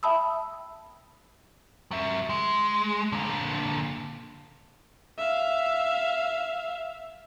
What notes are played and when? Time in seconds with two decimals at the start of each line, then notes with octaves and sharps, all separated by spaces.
0.03 E5 G5 A5 B5 D#6 E6
1.91 F#3 E5
2.29 G#3
3.12 A#2 D3
5.18 E5 F5